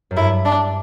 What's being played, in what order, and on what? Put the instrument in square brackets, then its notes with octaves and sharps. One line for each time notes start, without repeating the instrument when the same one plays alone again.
[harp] F#2
[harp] G2 [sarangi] E4
[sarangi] D4